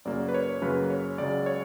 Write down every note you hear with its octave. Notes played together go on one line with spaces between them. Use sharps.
F#2 C#3 F#3 A#3 D5
B4
C#5
F#2 C#3 F#3 A#3 B4
C#5
C#2 C#3 F#3 D5
C#5